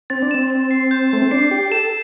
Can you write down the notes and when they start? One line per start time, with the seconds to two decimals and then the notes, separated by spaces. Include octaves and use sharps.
0.10 C4 A6
0.22 D4
0.31 C4 E7
0.50 E7
0.71 C7
0.91 G6
1.11 A3 G6
1.22 C4
1.31 D4 C7
1.51 G4 C7
1.72 A4 E7